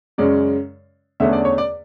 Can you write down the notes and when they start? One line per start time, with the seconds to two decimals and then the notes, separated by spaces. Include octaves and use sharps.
0.18 F#2 C#3 G#3 C#4 D5
1.20 E2 D3 A3 C#4 E5
1.33 D5
1.45 C#5
1.58 D5